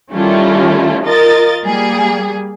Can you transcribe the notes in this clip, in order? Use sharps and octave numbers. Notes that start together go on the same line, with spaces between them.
D#3 G3 A3 C#4 E4 F4
F4 A#4 D#5 A6
G3 A#3 G#4